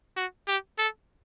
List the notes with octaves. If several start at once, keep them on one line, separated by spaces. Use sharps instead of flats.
F#4
G4
A4